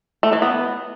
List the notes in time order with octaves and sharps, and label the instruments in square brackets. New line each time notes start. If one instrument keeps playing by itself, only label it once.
[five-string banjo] A3
E3
B3